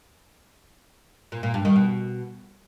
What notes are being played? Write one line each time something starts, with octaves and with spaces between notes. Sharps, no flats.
A#2
A#2
G2
D#3
B2